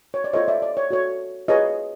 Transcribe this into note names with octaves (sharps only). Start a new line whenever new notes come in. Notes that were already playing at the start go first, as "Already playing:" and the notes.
C#5
D5
F4 A4 C5 C#5 D#5
D5 E5
D5
C#5
F#4 A4 C#5
F4 G#4 B4 C#5 D#5